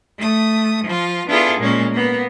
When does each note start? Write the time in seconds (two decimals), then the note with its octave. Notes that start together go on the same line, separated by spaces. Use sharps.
0.18 A3 D#6
0.85 F3 F4
1.27 B3 D4 E4 F4 G#4 A4
1.58 A#2 G#3 A#3 C#4
1.91 A#3 B3